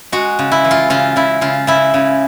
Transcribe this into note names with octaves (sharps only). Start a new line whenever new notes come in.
G#3 F#4
C#3
E4
E3
F4
C#3 F4
C#3 E4
C#3 F4
C#3 E4
C#3